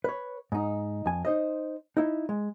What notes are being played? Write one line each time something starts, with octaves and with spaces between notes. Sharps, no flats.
B4 C#5
G#2 D#4
F2 G#5
D#4 C5 D#5
D#4 E4
G#3